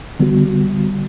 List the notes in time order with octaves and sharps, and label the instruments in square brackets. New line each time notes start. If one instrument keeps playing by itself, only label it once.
[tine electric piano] D3 G3 B3 F#4